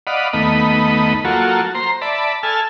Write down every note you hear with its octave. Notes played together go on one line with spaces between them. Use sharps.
D5 D#5 F5 F#5 B5
D#2 A3 B3 D#5 B5
F#3 A#3 F4 F#4 A4
C5 A#5 C6
D5 E5 A5 B5
A4 G#5 A5 E6 F6